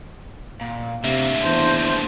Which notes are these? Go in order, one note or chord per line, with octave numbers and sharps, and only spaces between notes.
A#2
D2 C3 A#3 E5
E2 C5 A5